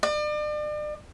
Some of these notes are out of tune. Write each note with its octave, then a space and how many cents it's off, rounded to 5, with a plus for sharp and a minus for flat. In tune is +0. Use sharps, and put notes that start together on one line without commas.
D5 +40